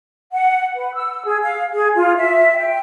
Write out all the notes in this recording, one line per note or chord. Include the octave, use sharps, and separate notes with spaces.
F#5
B4
E6
G#4
F5
G#4
F4
E5
G5